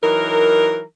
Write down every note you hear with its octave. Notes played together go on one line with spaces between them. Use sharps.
E3 F#3 D#4 A#4